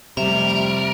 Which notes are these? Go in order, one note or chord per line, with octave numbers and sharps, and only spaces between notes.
F2 C3 G3 A3 A#4 E5